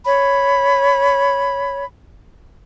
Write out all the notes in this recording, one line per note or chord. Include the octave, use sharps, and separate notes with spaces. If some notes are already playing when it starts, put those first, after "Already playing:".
C#5 B5